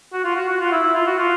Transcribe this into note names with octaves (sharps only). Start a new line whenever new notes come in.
F#4
F4
F#4
F#4
F4
E4
E4
F4
F#4
F4